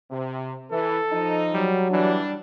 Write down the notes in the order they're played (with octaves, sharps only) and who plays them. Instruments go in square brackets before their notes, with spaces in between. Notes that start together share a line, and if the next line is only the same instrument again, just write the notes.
[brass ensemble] C3
[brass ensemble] E3 [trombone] A4
[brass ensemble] F3 D#4
[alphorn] F#3 [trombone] G3
[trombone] E3 [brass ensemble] G3 D4